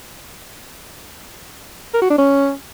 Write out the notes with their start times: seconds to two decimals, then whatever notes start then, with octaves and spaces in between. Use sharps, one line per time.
1.94 A#4
2.02 F#4
2.10 D4
2.18 C#4